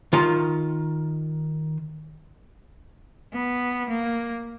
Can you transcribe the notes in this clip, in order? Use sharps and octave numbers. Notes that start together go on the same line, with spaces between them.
D#3 F4 A#5
B3
A#3